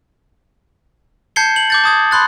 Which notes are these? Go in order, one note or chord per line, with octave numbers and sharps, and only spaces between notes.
A5 G6 G#6 C7 C#7 G7
F#7
D6 G6 A6
A5 D#6 G#6
B5 C6 F#6 A6